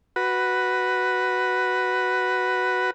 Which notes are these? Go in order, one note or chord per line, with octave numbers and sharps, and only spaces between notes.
F#4 B4